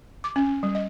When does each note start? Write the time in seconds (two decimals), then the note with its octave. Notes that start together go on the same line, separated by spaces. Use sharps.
0.24 D6
0.36 C#4
0.63 G3
0.75 D#5